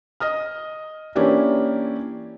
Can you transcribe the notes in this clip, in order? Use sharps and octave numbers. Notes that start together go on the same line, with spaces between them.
D#5 D#6 F6
E3 A#3 C#4 D4 E4 G4